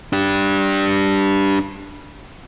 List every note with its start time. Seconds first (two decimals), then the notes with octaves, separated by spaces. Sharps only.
0.13 D4 G4